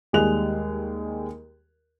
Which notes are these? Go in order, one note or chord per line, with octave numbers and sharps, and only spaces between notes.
D#2 G3 G#3 G#4 F#6 F7